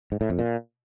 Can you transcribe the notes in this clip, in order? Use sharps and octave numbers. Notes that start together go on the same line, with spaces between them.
G#2
A2
F2
A#2